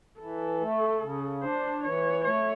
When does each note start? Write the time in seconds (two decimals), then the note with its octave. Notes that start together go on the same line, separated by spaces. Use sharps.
0.20 E3 A4
0.61 A3
1.01 C#3
1.43 D4 C5
1.84 E3 C#5
2.25 A3 C#5